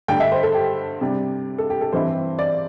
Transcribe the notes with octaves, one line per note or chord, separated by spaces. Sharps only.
G2 D3 A3 D4 G5
E5
C5
A4
G4
C3 G3 D4
A4
G4
A4
G2 E3 C4 E4 C5
D5